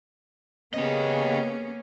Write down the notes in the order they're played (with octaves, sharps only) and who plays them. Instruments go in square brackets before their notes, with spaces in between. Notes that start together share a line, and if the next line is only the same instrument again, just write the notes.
[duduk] C#3 [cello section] A#3 B3 C#4 [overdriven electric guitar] G4 D#5